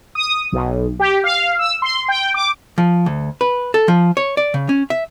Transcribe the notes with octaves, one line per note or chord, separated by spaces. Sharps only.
D#6
B1
G4
F5
E6
C6
G5
D6
F3
D2
B4
A4
F3
C#5
D5
C#3
C#4
E5